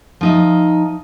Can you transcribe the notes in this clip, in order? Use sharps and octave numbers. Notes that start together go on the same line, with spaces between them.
F3 D#4 E5